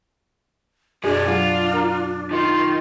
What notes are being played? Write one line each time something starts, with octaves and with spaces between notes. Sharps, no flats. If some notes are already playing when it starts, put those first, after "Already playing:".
F#2 B2 G3 D4 G#4
F#3 F4
A#4 A#5 F6
D#3 F4